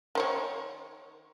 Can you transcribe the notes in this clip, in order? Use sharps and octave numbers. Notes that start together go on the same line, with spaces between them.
D#3 C5 C#5